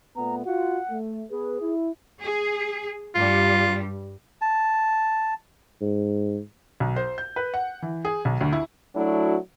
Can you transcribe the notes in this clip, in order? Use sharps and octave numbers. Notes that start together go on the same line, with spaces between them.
A#2 A3 B3 A#5
F4 F#4 F#5
A3
B3 G#4 B4
E4
G#4
G2 G3 F4
A5
G#2
B1
C5
G6
B4
F#5
E3
G#4
B1
D2
E4
F#3 A3 D4 E4 F#4